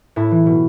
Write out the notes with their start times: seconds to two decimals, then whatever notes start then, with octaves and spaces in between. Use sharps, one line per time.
0.16 A2 E4
0.31 E3
0.46 B2